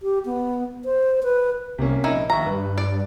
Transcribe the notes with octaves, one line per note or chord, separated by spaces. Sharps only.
G4
B3
C5
B4
C2 C3 A#3 C#4
A#1 D#4 E4
D#2 E5 A#5 C#6
G2 B4
D5